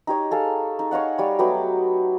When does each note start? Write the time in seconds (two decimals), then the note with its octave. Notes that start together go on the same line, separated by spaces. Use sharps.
0.07 D#4 G4 C#5 D#5
0.31 G#4 A4 F5
0.79 D#4
0.91 C#5 D#5 F5 F#5
1.18 G3 C#5
1.39 F#3 A3 B3 G4